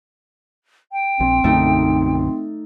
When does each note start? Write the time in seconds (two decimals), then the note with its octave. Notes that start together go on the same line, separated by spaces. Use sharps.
0.92 G5
1.20 A#1 C4
1.44 B1 F#2 D3 A3 D#4